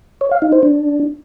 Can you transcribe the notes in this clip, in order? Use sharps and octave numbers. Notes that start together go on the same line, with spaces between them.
C#5
F5
D#4
C5
D4